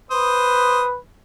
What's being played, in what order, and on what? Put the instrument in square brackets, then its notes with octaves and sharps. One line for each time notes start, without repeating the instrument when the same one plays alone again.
[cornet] B4 [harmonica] C5 D#6